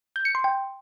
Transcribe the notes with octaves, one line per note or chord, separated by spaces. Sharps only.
G6
C#7
C6
G5